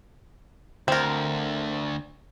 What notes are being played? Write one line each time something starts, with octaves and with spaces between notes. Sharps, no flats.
D2 C4 A#4